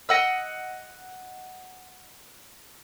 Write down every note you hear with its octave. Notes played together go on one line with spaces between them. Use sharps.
D#5 F#5 E6